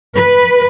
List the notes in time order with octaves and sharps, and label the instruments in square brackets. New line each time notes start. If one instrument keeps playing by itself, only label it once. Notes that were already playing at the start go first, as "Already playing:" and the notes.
[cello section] B4